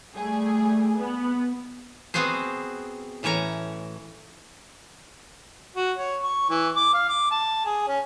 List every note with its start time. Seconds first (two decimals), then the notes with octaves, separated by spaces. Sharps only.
0.14 G3 A3 G#4
0.98 B3
2.14 B3 C4 F#4 G#4 C5
3.23 A2 E3 C#4 C#5 A#5
5.76 F#4
5.97 C#5
6.23 C#6
6.50 E3
6.75 D6
6.94 F5
7.09 D6
7.31 A5
7.65 G#4
7.87 C#4